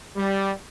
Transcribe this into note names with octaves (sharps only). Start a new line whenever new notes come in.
G3